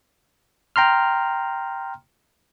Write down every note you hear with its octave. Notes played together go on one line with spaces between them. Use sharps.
G5 A#5 C6 F6